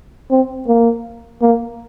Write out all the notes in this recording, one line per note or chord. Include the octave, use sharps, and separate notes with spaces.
C4
A#3
A#3